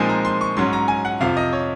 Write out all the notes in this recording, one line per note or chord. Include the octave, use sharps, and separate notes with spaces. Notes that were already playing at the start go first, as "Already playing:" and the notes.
Already playing: A#2 F3 G#3 C4 D#4 G#5
A#5
C6
C#6
G#2 F#3 C#4 C6
A#5
G#5
F#5
F2 C3 F3 F5
D#5
C#5